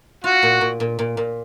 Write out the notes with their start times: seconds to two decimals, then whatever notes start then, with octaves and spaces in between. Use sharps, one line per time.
0.24 F4 F#4
0.43 A#2
0.61 A#2
0.80 A#2
0.99 A#2
1.17 A#2